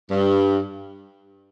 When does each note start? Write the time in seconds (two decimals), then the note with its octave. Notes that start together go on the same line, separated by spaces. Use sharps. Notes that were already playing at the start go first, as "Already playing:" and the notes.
0.11 G2